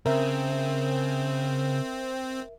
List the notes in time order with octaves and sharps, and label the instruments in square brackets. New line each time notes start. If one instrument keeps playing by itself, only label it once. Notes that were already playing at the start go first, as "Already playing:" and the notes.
[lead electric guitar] C#3 [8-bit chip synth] C4 [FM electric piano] A#4 E5